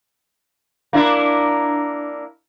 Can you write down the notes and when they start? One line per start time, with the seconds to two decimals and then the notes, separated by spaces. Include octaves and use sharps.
0.93 A#3 D4 E4